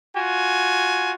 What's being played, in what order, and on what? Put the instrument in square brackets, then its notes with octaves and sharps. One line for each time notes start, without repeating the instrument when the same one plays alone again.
[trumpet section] F4 F#4 G#5